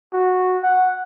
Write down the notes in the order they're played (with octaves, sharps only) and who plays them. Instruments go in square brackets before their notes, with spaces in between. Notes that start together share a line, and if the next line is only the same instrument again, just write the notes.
[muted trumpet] F#4
F#5